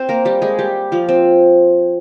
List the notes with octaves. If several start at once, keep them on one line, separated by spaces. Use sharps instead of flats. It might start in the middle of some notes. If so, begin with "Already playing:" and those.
Already playing: C4 C5
A#3 A#4
G3 G4
G#3 G#4
G3 G4
F3 F4
C4